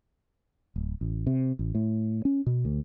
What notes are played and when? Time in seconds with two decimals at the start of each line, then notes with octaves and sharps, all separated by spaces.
0.76 D1
1.01 A1
1.27 C3
1.59 A1
1.75 A2
2.25 C#4
2.46 B2
2.65 D2